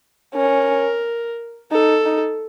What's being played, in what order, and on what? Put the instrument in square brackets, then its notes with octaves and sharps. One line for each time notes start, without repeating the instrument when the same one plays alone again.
[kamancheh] C#4 [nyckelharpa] A#4
[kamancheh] D#4 [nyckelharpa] A4
[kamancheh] D#4